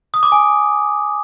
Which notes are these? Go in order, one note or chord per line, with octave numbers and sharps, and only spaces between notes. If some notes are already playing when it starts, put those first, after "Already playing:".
D#6
D6
G#5